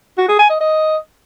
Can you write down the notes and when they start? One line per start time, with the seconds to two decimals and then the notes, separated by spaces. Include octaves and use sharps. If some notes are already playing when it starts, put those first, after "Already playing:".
0.18 F#4
0.28 G#4
0.39 G#5
0.50 D#5
0.60 D#5